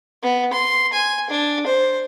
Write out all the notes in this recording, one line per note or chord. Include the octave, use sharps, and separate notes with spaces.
B3
C6
G#5
D4
C5